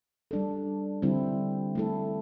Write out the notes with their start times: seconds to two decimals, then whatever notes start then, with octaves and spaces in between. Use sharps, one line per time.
0.31 G3 D4 A4
1.02 D3 G3 C4 E4
1.75 A3 E4 A4